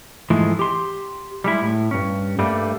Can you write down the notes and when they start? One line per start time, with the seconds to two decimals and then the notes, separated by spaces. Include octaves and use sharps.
0.30 G#2 E3 F3 G#3 A3
0.59 G4 C6
1.44 G3 G#3 E4
1.62 A2
1.91 G2 C#4
2.39 G2 G3 A3 A#3